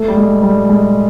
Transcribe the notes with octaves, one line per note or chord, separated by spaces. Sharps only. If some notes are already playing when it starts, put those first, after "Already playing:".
Already playing: A3
G3
G#3
G3
G#3